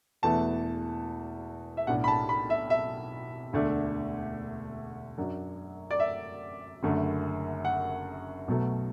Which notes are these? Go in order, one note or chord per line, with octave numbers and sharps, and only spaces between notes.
E1 E2 E3 A3 A5
E5
B1 A2 A3 D4 F#5
B5
A5
B5
E5
E5
E1 D2 D3 A3 D4
F#2 F#3 D4
D5
E5
F#1 F#2 D3 A3
F#5
B1 B2 F#3 A3